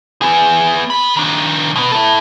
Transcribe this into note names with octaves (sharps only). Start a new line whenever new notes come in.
B3 G#4
B3 B5
D#3 D4
B2 B3
E4 A4